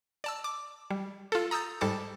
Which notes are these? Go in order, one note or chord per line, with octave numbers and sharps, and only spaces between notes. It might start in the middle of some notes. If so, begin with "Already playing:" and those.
D5 A5 E6
D6
G3
F4 A4
A#5 D#6 E6 G6 A6
G#2 G3 A4 A5 D6